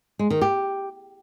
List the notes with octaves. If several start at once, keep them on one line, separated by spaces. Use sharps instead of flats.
G#3
D#3
G4